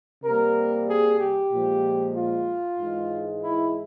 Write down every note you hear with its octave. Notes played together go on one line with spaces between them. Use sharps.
C3 G3 A#3 A#4
G#4
G4
A#2 F3 G#3
F4
G#2 E3 G#3
E4